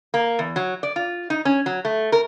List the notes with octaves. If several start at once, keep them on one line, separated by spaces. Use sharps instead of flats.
A#3
E2
F#3
D5
F4
D#4
C#4
F#3
A3
A#4